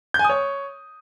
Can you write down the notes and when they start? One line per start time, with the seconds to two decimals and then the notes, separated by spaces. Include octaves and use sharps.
0.14 G6
0.19 G#5
0.24 D#6
0.29 C#5